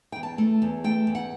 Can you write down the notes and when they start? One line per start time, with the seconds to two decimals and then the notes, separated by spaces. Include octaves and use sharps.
0.12 E2 G5
0.23 A5
0.38 A3
0.62 E2
0.84 A3 G5
1.07 E2
1.15 F#5